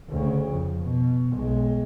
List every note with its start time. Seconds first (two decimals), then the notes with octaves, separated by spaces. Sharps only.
0.10 D2 C#3
0.52 F2
0.81 B2
1.34 B1 G#3